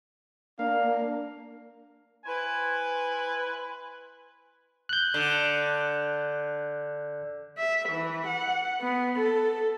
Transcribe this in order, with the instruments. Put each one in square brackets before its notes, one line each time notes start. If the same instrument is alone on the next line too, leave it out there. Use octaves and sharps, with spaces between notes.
[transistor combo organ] A#3 [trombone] D4 [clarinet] F5
[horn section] E4 B4 C5 G#5
[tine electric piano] F#6 G6
[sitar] D3
[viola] E5
E3
F#5
B3
A4